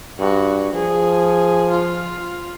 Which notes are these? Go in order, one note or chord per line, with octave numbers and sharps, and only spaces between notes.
G2 F#4
F3 G#4
F4